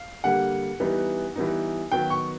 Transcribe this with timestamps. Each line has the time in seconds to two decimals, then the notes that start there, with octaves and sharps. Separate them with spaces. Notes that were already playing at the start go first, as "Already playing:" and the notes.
Already playing: F5
0.24 D3 G3 A#3 F#5
0.80 E3 G3 B3 D#4
1.36 E3 G3 B3 D#4
1.92 D#3 F#3 B3 G5
2.10 C#6